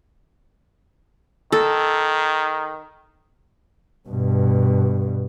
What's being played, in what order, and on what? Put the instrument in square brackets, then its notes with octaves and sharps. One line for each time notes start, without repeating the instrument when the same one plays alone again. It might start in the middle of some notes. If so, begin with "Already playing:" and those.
[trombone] D#3 [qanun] A4
[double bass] G2 B2